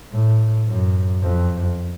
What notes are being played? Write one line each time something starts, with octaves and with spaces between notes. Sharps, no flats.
A2
F#2
F2